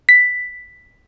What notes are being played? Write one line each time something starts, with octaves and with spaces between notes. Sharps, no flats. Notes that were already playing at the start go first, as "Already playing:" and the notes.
B6